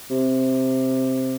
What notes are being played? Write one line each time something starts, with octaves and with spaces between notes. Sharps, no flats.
C3